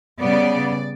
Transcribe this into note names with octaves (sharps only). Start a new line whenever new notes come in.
C#3 G3 B3 D5